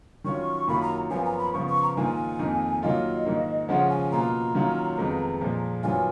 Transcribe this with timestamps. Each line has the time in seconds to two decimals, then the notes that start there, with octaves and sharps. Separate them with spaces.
0.24 D#3 F#3 C#4 F4 C#6
0.67 F#2 D#3 F#3 A#3 F4 B5
0.82 A#5
1.10 F#2 F3 B3 F4 G#5
1.25 A#5
1.39 B5
1.53 C#3 F3 B3 F4 C#6
1.68 C#6
1.83 A#5
1.97 G#2 D#3 A#3 F4 G#5
2.39 F2 D#3 A#3 D#4
2.83 D#3 F#3 A#3 F4 D#5
3.25 G#2 D#3 A#3
3.68 C#3 F3 G#3 C#4 F4 F#5
3.90 G#5
4.12 B2 A#3 F4 A#5
4.55 D#3 F#3 A#3 C#4 F4
4.98 F2 D#3 G#3 B3 D#4
5.41 A#2 F3 G#3
5.83 F#2 D#3 F#3 B3 F4 G#5